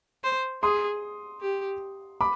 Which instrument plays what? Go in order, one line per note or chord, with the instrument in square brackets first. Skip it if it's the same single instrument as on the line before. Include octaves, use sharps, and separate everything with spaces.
[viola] C5
[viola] G#4 [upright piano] C6 D#6
[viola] G4
[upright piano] B5 D6